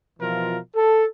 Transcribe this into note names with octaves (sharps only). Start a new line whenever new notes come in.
B2 E3 F3 F4 A#4
A4